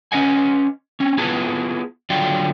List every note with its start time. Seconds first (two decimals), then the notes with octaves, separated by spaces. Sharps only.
0.12 C#4 E4 B4 D#5 F#5 G#5
1.00 C4 C#4
1.18 B3 E4 F4 G#4 B4 A5
2.10 D3 F#3 F4 D5 F5 G5